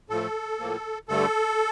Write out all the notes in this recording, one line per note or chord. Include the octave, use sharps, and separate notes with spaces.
A2 F3 A3 A4
A2 F3 A#3
G2 D3 A3 A4